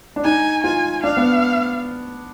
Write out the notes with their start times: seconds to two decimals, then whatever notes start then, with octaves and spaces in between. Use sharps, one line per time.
0.16 D4
0.24 D#4 G#5
0.64 F4 G#5
1.03 D4 F5
1.17 B3